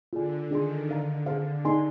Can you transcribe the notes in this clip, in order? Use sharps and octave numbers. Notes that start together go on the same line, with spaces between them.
D3 F4 G#4 D5 G#5
D#3 D4 G#4 D5 G#5 C6
D3 A#4 F5 A#5
G#4 C5 F5
D#4 G#4 D5 G#5 C6